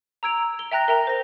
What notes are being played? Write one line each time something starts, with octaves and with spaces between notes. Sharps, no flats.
A#5 E6 G#6 D7 F7
G7
E5 G5 A#5 F#6 A#6
A#4 E5 G5 A#5
C5 A#6